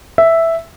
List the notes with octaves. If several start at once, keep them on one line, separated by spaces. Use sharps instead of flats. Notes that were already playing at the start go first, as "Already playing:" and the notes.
E5